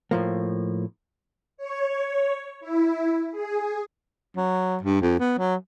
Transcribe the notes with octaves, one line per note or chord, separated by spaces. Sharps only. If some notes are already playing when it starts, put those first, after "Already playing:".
A2 F3 A#3
C#5
E4
G#4
F#3
G2
F2
B3
F#3